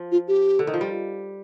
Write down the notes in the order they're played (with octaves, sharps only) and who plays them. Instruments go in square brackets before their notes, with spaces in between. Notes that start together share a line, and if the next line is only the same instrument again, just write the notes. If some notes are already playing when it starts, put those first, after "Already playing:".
Already playing: [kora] F3
[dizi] F4
G4
[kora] D3
D#3
F3
G3